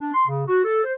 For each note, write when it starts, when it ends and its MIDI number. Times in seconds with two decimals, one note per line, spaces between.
0.01 0.13 62
0.13 0.27 84
0.28 0.42 49
0.47 0.63 66
0.65 0.83 69
0.84 0.92 72